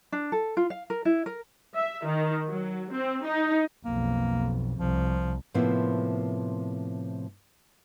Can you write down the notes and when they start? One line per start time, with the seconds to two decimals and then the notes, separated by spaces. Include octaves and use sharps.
0.12 D4
0.32 A4
0.57 F4
0.70 F5
0.90 A#4
1.05 E4
1.26 A#4
1.76 E5
2.06 D#3
2.48 F#3
2.92 C4
3.25 D#4
3.85 B1 F2 A#3
4.79 C2 F3
5.54 A2 C3 F3 A#3 B3 E4